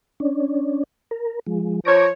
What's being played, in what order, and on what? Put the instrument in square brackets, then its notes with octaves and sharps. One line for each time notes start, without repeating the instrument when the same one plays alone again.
[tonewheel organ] C#4 D4
A#4
F3 G#3
[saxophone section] F3 C#5 [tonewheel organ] A#5 D6